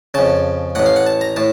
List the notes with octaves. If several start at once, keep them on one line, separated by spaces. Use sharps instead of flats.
F2 C#3 A5
A1 A2 F#5
F5
F#5
A5
A#5
A2 A5